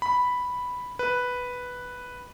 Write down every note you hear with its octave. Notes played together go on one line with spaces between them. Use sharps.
B5
B4